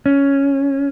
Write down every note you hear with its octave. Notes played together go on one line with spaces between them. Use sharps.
C#4